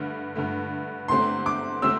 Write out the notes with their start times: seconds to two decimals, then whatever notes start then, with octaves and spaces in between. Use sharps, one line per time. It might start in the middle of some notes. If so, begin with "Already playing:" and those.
Already playing: G2 D3 A3
0.35 G2 D3 A3
1.08 E2 D3 A3 C4 G4 C6
1.46 D6
1.82 D3 A3 C4 G4 E6